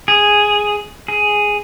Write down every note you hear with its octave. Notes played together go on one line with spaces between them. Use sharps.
G#4
G#4